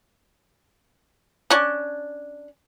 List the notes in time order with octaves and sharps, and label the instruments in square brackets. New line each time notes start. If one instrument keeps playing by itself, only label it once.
[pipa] C#4 D4